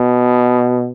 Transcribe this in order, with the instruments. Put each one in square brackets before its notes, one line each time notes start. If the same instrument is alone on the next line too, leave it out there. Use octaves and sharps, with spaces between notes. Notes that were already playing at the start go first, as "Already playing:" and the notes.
Already playing: [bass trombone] B2